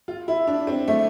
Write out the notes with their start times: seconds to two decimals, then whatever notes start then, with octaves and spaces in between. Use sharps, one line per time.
0.08 F4
0.28 E4
0.47 D4
0.67 C4
0.88 A3